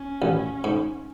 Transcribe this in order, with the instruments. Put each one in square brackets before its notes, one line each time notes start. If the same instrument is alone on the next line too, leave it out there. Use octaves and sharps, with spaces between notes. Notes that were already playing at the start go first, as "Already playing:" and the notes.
Already playing: [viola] C#4
[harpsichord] A1
G#2